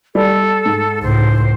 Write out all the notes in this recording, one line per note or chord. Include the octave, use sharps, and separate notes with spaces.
G3 A4
G#2
C#2 A2 C5